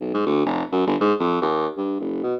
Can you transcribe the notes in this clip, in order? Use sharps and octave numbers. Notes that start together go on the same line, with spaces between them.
B1
G#2
D2
F1
F#2
G1
G#2
F2
D#2
G2
F#1
B2